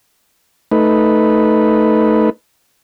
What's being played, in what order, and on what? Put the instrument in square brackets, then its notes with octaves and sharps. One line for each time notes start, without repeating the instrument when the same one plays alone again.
[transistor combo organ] A3 D#4 B4